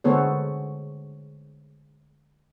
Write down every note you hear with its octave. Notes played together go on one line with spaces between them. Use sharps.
D3 G#3 B3 A4 C5 C#5